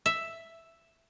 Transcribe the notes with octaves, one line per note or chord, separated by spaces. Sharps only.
E5